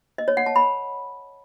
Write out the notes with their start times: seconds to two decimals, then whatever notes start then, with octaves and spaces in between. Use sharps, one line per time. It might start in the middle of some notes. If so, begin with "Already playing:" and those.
0.18 D#5
0.28 C#5
0.37 F#5
0.46 A5
0.56 B5